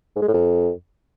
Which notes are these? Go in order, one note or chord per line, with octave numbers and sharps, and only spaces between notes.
G#2
G#3
A2
F2